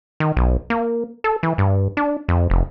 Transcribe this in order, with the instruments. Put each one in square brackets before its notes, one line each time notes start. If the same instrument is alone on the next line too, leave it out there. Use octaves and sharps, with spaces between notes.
[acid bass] D#3
B1
A#3
A4
E3
G2
D4
F2
F1